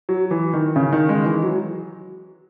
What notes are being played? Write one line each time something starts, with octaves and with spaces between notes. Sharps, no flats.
F#3
E3
D#3
C#3
D#3
G#3
E3
F#3